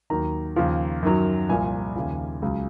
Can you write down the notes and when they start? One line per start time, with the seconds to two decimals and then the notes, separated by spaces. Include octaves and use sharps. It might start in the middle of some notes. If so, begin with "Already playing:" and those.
0.10 D#2 D#3 F#3 A#5
0.56 D#2 C#3 F3
1.03 F#2 D#3 F#3
1.49 C2 A#2 F3 G#5
1.96 D#2 C#3 F3
2.42 C#2 C#3 F#3